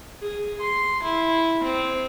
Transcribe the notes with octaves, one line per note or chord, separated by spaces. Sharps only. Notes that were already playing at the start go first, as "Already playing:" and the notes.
G#4
C6
E4
C4